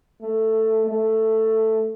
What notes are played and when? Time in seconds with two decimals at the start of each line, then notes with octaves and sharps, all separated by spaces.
0.22 A3
0.87 A3